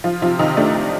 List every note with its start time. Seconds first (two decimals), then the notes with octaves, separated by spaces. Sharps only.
0.04 F3 F4
0.22 C3 F3 F4
0.39 C3 D#3 D#4
0.57 A3 D4
0.74 C3